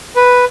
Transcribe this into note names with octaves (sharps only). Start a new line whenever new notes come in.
B4